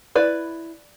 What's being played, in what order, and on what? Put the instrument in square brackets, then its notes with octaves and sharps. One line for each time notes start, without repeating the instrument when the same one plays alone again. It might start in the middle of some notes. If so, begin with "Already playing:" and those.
[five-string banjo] E4 B4 D5